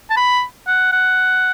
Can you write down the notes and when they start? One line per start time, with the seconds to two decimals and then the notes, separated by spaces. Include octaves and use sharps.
0.10 A5
0.17 B5
0.67 F#5
0.92 F#5